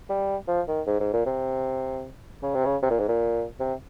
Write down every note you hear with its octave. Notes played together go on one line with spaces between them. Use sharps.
G3
F3
D#3
G#2
G#2
A#2
C3
C#3
C3
C#3
C3
A#2
G#2
A#2
C3